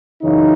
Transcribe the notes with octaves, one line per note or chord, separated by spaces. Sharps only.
F#2 C#3 E3 D#4